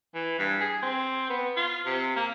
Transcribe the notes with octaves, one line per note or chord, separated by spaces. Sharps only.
E3
G2
G#4
C4
B3
F4
C3
A#3